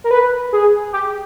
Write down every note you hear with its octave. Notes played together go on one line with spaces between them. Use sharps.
A#4
B4
G#4
G4